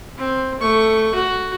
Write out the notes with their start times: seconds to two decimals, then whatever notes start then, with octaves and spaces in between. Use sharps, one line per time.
0.18 C4
0.60 A3 C#6
1.15 F#4